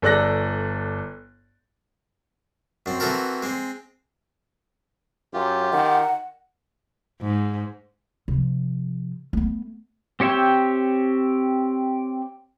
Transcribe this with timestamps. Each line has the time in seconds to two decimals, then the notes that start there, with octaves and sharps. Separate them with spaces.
0.02 G1 A4 D5 F#6 A#6
2.86 F#2 C4
3.00 E3 C4 F#4 A4 A#4
3.43 G#3 C4
5.33 F#2 F4 G4
5.73 D#3 F#5
7.22 G#2
8.28 C3 F3
9.33 A3 B3
10.20 C4 G4 C#5 E5 G5